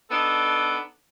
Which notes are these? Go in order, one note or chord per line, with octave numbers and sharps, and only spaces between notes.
B3 D4 D#4 A4